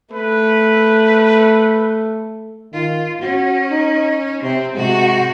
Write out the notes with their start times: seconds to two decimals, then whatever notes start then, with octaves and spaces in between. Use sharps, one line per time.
0.13 A3 B4
2.73 D#3 F4
3.22 C#4 F#4
3.71 D#4
4.42 C3 C4
4.75 C3 G#3 F#4